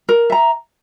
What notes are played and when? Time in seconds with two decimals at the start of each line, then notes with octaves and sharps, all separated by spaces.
0.09 A#4
0.30 E5 A#5